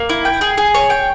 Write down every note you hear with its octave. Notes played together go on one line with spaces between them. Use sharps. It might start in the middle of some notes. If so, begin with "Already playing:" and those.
Already playing: A#3
E4
G5
G#4
G#4
C#5
G5